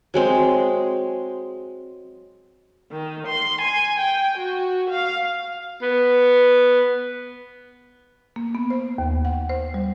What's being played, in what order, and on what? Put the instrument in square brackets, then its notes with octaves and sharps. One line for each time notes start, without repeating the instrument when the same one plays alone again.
[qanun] F#3 G#3 C4
[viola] D#3
C6
G#5
G5
F#4
F5
[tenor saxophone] B3
[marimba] A#3
B3
C5
D#2
F#5
C5
G3